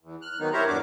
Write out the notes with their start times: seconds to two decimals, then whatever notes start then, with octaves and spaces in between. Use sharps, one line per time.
0.01 E2
0.22 F6 F#6
0.39 D#3 F#3 A#3 B3 D#4
0.53 E4 G4 A#4 C5 C#5 A#5
0.67 E2 G2 D4 F#4 D6